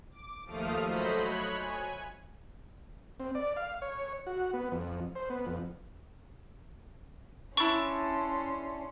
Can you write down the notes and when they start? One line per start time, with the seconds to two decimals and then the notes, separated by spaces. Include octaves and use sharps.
0.11 D6
0.45 D#2 F3 A3 F5 D#6 F6
0.84 F#3 A3 C5 D#5 B5 B6
1.14 C#5 B5 F#6
1.56 G#5
3.20 C4
3.35 D5
3.56 F5
3.82 C#5
4.27 F#4
4.53 B3
4.72 F2
5.16 C5
5.30 B3
5.46 F2
7.57 C#4 D4 E4 C6 C#6